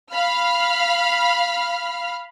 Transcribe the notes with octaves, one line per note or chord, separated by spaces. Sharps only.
F5 B5 F6